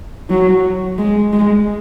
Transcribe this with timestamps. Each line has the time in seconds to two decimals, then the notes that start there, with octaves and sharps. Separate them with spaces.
0.30 F#3
0.98 G#3
1.33 G#3